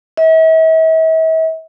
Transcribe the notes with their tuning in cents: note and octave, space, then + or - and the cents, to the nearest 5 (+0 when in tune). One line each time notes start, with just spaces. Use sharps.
E5 -45